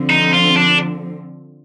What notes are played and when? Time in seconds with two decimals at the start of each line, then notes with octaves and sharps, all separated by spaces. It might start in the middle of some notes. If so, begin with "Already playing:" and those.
Already playing: D3 F3 C4
0.10 D#4
0.33 F4
0.56 D4